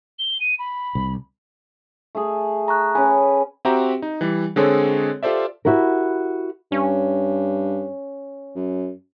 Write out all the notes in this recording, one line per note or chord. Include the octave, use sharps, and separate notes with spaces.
G7
D#7
B5
C2
A3 G#4
A#5 C#6 F#6
C#4 G#4 B4 G#5
C4 F#4 G4 E5 G5 A#5
D#4
E3 G3
D3 G#3 C4 G#4 A4 C#5
F4 G4 A4 C5 D5 E5
E4 F#4 G4 A#4
G2 C#4
F#2